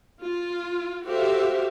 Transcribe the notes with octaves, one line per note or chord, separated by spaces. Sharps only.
F4
F#4 G4 A4 C5 E5 F5